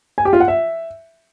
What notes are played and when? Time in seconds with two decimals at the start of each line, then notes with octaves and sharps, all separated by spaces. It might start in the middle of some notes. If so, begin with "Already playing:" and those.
0.18 G#5
0.25 G4
0.33 F4
0.40 F#5
0.48 E5